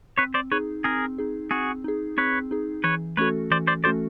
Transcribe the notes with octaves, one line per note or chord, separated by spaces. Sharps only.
C4 B4 C#5
C5 D5
D#4 G#4 B4 C#5
C4 G#4 A#4
D#4 G#4
C4 F#4 G#4
D#4 G#4
C4 B4 C#5
D#4 G#4
E3 B4 C#5
A3 C#4 F#4 A4 B4 C#5
E3 C5 D5
C5 D5
A3 C#4 F#4 A4 C5 D5